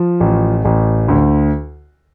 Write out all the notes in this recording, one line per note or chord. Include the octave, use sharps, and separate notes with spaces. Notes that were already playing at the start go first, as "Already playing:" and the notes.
Already playing: F3
A1
A1
D2